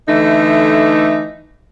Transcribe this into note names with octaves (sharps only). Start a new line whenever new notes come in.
D3 E3 A3 D#4